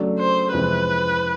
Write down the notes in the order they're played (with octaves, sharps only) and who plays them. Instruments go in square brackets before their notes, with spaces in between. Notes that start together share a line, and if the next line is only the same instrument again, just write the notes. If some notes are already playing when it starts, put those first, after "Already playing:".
Already playing: [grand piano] C#3 F#3 A3 D4
[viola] C5
[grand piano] F2 C3 E3 G#3 C4 [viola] B4